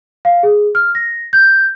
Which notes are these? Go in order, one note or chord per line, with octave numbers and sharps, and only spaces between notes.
F5
G#4
F6
A#6
G6